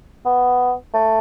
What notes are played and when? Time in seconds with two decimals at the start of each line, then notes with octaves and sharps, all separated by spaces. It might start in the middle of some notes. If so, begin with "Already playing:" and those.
0.25 B3
0.94 A3